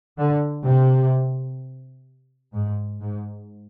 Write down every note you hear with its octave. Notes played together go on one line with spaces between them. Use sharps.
D3
C3
G#2
G#2